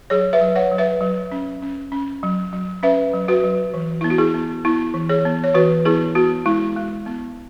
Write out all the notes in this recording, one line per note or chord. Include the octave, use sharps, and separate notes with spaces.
F#3 G#4 C#5
B4 E5
F#3
C#5 F#5
F#3
B4 E5
F#3
C#4
C#4
C#4
F#3
F#3
C#4 B4 E5
F#3
F#4 B4
F#3
E3
B3 E4
F#4
E4 G#4
B3
B3 E4
E3
G#4 C#5
B3
C#5
E3 F#4 B4
B3 E4 G#4
B3 F#4
G#3 E4
G#3
B3